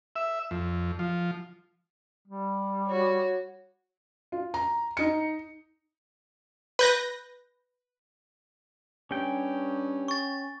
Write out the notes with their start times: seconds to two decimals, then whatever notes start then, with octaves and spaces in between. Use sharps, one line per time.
0.16 E5
0.51 F2
0.99 F3
2.28 G3
2.87 F#4 C#5
4.32 F4
4.54 A#5
4.97 D#4 C#7
6.79 B4 G6 A#6
9.11 G2 C#4 G5
10.08 C#6 A6